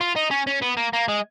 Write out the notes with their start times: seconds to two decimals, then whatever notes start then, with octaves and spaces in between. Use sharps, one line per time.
0.01 F4
0.16 D#4
0.31 C#4
0.47 C#4
0.62 B3
0.77 A#3
0.93 A#3
1.08 G#3